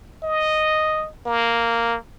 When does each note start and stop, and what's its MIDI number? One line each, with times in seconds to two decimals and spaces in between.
0.23 1.08 75
1.26 1.97 58